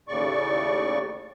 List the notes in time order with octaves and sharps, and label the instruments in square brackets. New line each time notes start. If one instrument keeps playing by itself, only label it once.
[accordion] D#2 A2 C#3 D5 C#6